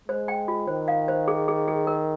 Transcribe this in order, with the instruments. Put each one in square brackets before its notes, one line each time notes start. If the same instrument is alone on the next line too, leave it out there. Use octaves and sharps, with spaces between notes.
[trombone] G#3 [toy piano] C5
[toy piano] G5
F4
[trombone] D#3 [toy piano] C5
[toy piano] F5
C5
G#4
G#4
G#4
A#4